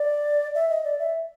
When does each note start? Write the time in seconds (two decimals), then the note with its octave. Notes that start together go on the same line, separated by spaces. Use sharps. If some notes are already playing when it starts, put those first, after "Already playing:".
Already playing: D5
0.55 E5
0.70 D#5
0.84 D5
0.99 E5